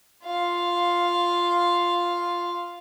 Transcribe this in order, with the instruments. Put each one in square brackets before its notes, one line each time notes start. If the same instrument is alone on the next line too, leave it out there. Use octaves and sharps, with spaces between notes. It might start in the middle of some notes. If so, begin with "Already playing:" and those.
[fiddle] F4 F5